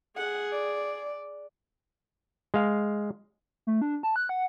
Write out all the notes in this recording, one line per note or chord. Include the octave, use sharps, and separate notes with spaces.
G#4 F#5
D5
G#3 F5
A3
D4
A5
F#6
F#5